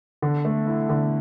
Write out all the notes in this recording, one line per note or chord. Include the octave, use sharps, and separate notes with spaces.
D3
A3
E4
D3